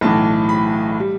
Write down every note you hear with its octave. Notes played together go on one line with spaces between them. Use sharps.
B1 A2 E3 A5
B5
G3